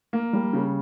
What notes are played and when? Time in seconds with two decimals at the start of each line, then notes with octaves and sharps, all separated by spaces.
0.13 A#3
0.33 G3
0.53 C#3